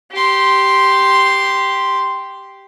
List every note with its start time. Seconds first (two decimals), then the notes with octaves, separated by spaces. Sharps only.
0.12 G4 C6